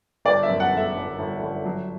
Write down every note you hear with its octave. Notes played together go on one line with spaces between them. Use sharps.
G1 D5
E5
F#2
F#5
D3
E5
G1
G1
G1
F#3